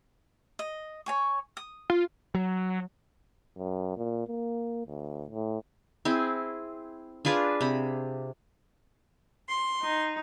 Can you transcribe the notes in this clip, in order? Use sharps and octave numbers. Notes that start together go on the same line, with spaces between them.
D#5
C#5 G#5 C#6
D#6
F4
F#3
F#2
A#2
A#3
D2
A2
C4 E4 G#4
D4 F4 G#4 B4
C3 B5
C6
D#4